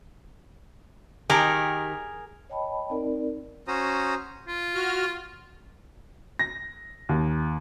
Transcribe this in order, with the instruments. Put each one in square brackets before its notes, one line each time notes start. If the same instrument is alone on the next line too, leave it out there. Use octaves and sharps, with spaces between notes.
[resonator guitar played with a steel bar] D#3 G4 G5 [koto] G#4 A#4
[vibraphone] C#5 D#5 G5 A5 B5
C4 D#4 A#4 D5
[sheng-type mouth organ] C#4 F#4 C5 A#5 D#6
[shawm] F4
[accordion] F#4 F6
[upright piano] A#6
D#2